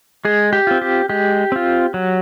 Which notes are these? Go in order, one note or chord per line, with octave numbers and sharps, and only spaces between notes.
G#3 G#4
G4
C4 F4
G4
G#3 G4
C4 F4
F#3